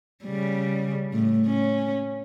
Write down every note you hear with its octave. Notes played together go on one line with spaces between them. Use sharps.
C#3 G3
A2
C#4